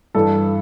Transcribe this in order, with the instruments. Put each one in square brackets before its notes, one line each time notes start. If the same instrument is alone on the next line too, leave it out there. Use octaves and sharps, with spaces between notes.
[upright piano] G2 E3 A4